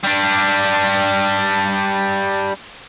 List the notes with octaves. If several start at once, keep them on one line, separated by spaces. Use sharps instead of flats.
G3 D4